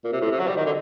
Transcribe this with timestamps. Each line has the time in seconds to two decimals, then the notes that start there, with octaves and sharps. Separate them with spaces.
0.04 A#2
0.12 C3
0.21 A2
0.31 C3
0.39 F#3
0.47 G3
0.57 D#3
0.66 D3